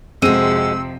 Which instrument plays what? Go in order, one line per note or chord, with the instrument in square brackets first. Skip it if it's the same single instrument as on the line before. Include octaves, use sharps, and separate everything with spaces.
[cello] F2 C3 [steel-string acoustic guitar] G#3 F#4 [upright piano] C4 D#7 [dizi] E6